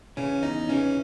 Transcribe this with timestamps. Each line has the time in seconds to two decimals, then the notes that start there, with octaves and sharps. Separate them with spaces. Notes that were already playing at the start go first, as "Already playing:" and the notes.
0.17 C#3 E3 C#4
0.43 E2 D#4
0.68 C#3 E3 C#4